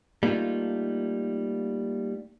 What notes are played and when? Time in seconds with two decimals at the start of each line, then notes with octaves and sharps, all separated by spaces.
0.23 G3 A3 A#3 D#4 F4